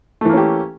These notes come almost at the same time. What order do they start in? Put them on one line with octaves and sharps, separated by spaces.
A3 E3 A#3 C#4 G4